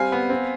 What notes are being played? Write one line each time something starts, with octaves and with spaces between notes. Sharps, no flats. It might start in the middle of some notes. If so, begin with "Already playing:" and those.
Already playing: G3 C4 F5 G#5
B3
C4